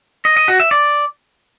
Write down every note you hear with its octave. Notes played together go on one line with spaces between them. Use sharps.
D#5
D#5
F#4
E5
D5